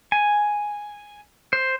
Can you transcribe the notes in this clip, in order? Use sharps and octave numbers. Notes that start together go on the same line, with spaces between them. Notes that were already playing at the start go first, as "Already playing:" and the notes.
G#5
C5